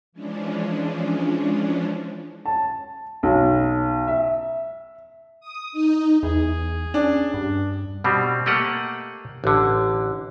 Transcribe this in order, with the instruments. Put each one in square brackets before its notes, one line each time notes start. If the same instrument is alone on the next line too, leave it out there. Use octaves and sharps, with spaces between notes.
[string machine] E3 F3 G#3 C#4 D4
[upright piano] A5
B1
E5
[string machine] D#6
D#4
[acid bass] E2 [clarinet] G#4
[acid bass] C#4 [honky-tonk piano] D4
[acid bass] G2
[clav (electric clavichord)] B2 G3 C4
A3 A#3 G4 D#5 F#5
A1 D3